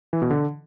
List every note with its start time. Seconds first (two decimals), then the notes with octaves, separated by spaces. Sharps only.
0.13 E3
0.22 B2
0.30 D3